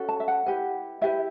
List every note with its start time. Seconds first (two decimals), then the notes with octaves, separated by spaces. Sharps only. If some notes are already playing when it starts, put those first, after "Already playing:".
Already playing: C#4 F#4 A4
0.09 A5
0.20 E5
0.28 F#5
0.46 E4 G4 B4
1.01 E4 G4 B4 E5